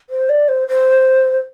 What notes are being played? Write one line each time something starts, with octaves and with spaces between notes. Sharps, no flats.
C5
D5
C5
C5